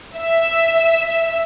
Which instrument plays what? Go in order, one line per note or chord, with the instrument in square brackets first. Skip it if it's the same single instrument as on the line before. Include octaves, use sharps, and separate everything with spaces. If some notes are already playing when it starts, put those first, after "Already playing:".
[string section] E5